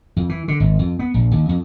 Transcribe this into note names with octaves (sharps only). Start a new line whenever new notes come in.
F2
E3
D3
G#1
F2
B3
A#1
D#2
F2